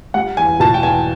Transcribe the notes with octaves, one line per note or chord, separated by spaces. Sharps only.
G3 F#5
E2 G#5
B2 A5
G5
E2 G#5